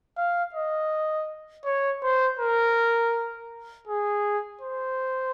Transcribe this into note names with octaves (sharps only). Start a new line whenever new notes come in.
F5
D#5
C#5
C5
A#4
G#4
C5